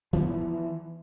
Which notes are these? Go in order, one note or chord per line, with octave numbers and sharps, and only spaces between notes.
E3 F3 B3